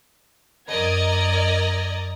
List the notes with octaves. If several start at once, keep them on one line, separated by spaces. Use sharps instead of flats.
F#2 A#4 D5 D#5 A#5 G#6